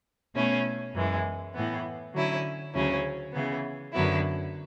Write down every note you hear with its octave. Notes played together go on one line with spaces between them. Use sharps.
B2 A3 C#4 E4
F#2 E3 G#3
A2 E3 B3
D3 F#3 C#4 E4
D2 C#3 F#3 C#4 E4
C#3 E3 B3
F#2 D3 F#3 B3 E4